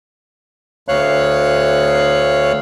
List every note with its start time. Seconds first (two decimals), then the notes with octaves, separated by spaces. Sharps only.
0.88 D2 C#5 F5 F#6